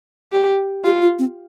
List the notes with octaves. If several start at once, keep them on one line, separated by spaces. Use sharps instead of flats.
G4
F4 G4
F4
C4